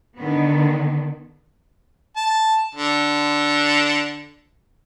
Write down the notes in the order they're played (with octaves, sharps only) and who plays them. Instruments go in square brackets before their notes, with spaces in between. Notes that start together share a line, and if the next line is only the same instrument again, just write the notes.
[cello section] D3 D#3 B3
[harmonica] A5
D3